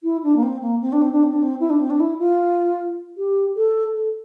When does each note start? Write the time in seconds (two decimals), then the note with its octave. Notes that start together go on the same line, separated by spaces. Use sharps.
0.03 E4
0.23 D4
0.36 A#3
0.43 C4
0.62 A#3
0.81 C4
0.92 D4
1.02 C4
1.12 D4
1.23 C4
1.33 D4
1.42 C4
1.60 E4
1.70 D4
1.79 C4
1.90 D4
2.00 E4
2.19 F4
3.17 G4
3.56 A4
3.95 A4